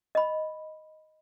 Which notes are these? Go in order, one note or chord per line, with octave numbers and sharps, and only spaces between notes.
D#5 B5